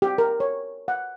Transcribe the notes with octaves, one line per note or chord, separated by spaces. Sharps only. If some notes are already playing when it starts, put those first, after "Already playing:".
G4
A#4
C#5
F#5